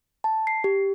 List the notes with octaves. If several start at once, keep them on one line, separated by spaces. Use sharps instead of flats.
A5
C7
G4